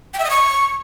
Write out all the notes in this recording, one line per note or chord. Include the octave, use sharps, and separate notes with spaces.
G5
E5
D#5
C#6